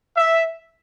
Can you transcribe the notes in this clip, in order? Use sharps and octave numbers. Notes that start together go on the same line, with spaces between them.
E5